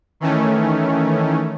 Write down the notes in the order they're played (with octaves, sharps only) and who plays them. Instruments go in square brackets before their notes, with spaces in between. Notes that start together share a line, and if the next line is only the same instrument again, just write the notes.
[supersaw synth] D#3 E3 A3 C#4